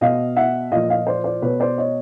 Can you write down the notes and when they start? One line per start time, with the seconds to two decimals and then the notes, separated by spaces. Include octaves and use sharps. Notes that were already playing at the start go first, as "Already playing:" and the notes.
0.01 B2 D#5 F5
0.36 E5 F#5
0.72 A#2 F3 D#5 F5
0.90 D#5 F5
1.07 C5 D5
1.24 C5 D5
1.42 B2 B4 C#5
1.60 C5 D5
1.78 C#5 D#5